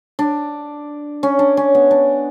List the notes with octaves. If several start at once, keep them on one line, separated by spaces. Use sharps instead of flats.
D4
C#4
D4
C#4
B3
D4